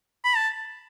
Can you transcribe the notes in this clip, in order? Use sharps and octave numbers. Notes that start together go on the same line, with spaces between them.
B5
A5